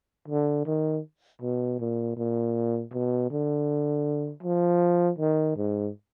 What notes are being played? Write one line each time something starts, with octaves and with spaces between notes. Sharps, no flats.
D3
D#3
B2
A#2
A#2
B2
D3
F3
D#3
G#2